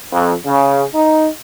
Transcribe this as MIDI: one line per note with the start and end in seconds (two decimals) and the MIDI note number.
0.12 0.34 41
0.46 0.84 49
0.95 1.28 63